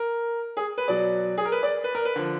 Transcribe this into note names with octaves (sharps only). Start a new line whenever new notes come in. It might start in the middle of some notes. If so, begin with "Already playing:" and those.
Already playing: A#4
G#4
B4
B2 F#3 D5
G#4
A#4
B4
D5
B4
A#4
B4
D3 F3